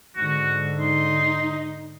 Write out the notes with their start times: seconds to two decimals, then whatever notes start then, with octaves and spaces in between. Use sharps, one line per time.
0.16 G#2 D3 F#4
0.80 D#4 C6